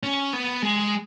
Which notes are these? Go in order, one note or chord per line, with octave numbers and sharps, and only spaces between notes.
C#4
B3
G#3